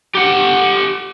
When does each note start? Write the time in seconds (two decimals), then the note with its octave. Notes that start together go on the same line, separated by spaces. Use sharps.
0.15 G4 F#5